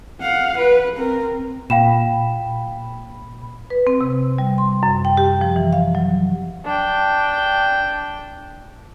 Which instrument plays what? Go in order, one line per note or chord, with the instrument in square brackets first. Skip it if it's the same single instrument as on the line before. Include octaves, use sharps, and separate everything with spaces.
[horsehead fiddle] F5 F#5
B4
C4 A#4
[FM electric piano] A#2 B5 [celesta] F5 G5 E7
[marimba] B4
C4
C3
G3
C6
F#2
G5
G4
F3
E3
F5
F#3
[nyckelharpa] D4 G5